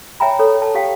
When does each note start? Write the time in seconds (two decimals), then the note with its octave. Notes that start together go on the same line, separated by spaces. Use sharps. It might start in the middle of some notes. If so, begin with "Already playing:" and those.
0.20 C#5 E5 G5 G#5 A#5 B5
0.39 A4 C#5
0.62 A5
0.75 G4 F5 G5